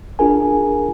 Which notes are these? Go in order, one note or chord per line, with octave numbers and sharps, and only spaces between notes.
D4 F4 G#4 A#4 G#5